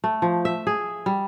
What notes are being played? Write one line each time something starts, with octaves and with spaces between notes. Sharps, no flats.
A3
F3
E5
G#4
G3